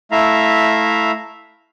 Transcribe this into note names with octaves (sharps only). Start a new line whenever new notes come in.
A3 E4 E5 F5 A#5